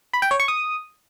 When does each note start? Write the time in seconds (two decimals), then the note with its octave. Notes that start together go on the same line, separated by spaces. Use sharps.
0.13 B5
0.22 G5
0.31 C#5
0.40 C#6
0.48 D#6